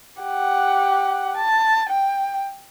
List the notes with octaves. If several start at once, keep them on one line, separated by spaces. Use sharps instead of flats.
G4 F#5
A5
G5